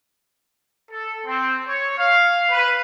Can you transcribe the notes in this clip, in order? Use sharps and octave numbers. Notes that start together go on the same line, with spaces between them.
A4
C4
C#5
F5
B4